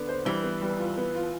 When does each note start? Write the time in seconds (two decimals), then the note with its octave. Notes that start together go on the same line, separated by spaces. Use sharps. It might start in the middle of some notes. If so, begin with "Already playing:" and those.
Already playing: D3 B3
0.09 C5
0.25 E3 G3
0.44 B3
0.62 G3
0.79 F4
0.97 B3
1.15 F4